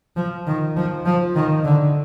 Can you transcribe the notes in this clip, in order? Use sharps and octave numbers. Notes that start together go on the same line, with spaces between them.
F3
D#3
F3
F3
D#3
D3